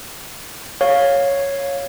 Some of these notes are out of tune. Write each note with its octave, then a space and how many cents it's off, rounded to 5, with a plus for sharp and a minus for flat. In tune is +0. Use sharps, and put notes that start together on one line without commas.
C#5 +0 F5 +5